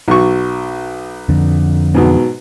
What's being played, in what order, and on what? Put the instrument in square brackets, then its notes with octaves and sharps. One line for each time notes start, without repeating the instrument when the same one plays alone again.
[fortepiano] B1 F#3 C#6
[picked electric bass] F2 D3
[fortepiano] G#2 B2 F#3